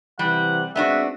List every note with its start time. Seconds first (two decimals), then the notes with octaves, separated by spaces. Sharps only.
0.19 C3 E3 G3 F#5
0.76 G#3 B3 C4 D4 F#4 E5